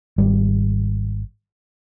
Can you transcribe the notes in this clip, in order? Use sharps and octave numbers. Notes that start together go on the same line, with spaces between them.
G#1 G3